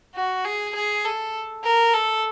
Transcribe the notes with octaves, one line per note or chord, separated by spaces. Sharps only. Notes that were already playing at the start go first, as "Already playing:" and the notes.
F#4
G#4
G#4
A4
A#4
A4